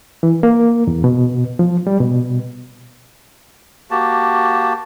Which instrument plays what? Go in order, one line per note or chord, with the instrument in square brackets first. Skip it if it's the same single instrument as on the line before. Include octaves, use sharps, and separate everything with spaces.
[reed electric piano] E3
A#3
E2
B2
F3
G3
B2
[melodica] A#3 F#4 G4 A5